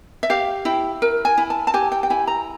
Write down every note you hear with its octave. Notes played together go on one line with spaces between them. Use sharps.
E5
G4 F5
E4 G5
A#4
G#5
E4
A5
A5
G4 G#5
G5
G5
E4 G#5
A#5